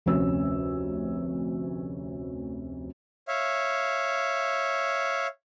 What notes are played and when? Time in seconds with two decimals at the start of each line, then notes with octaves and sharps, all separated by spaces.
0.06 F1 D2 C3 C#4 E6
3.28 C#5 E5 F5